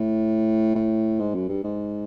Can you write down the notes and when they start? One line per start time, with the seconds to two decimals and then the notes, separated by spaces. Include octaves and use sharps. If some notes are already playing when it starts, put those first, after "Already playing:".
Already playing: A2
0.75 A2
1.19 G#2
1.34 F#2
1.49 G2
1.64 G#2